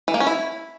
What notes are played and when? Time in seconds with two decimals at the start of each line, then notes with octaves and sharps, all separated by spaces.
0.08 E3
0.14 A#3
0.20 C#4
0.27 E4